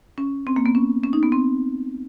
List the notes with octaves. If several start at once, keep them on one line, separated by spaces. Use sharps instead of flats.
C#4
C4
A#3
B3
C#4
C#4
D#4
B3
C4